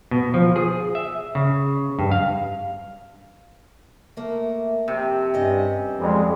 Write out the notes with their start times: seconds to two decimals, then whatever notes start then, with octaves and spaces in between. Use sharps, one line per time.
0.11 B2
0.34 F3
0.56 G#4
0.95 E5
1.35 C#3
1.99 G2
2.11 F5
4.17 A3 A#3
4.88 F2 C3
5.34 G2 C#4 D#5
5.99 F2 G3 G#3